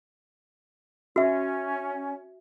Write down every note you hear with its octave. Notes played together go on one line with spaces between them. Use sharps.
C#4 F#4 E5